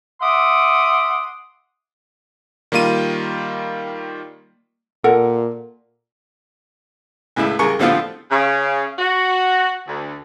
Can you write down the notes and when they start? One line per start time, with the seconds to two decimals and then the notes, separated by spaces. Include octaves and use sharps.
0.22 E5 F#5 C6 D6 D#6
2.72 D#3 G3 A#3 F4 D#7
5.04 A#2 A4 A#4 F#5
7.36 C#2 A2 C#3 E4
7.59 C2 C#3 G#4 A#4 C#6
7.79 A2 D3 F3 B3 C4 F4
8.30 C#3
8.99 F#4
9.86 D2